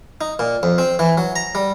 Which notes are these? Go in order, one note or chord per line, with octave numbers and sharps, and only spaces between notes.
D#4
A#2
F2
C4
E3
F#3
A#5
G3